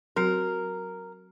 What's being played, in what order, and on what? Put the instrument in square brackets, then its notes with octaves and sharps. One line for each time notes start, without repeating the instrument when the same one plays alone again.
[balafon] F#3 C4 F#4 [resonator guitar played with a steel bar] A#4